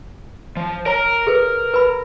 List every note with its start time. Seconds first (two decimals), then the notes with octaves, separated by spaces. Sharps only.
0.57 F3
0.86 A#4 C#5 A#5
1.27 G#4 A4 B4
1.74 B4 B5